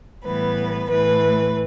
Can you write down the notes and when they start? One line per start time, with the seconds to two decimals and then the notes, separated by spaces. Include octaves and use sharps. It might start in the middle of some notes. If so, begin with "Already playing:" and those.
0.25 A2 E3 G3 B3 B4
0.90 A2 E3 A3 B4